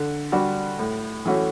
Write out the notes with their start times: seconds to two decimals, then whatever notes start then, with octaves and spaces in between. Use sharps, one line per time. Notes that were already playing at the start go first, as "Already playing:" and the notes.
Already playing: D3
0.32 G3 D4 F#4
0.79 A2
1.26 E3 A3 C#4 F#4